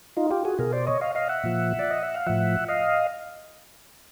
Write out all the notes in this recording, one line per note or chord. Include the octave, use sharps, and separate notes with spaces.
D#4 F4
F4 G4
F#4 G#4
B2 G#4 A#4
C5 D5
C#5 D#5
D#5 F5
D#5 F5
E5 F#5
A#2 F3
D5
D#5
E5
F5
A2 F3 E5 F#5
D#5 F5